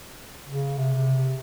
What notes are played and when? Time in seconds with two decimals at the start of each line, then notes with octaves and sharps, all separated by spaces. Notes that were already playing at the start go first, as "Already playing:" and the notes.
0.48 C#3
0.77 C3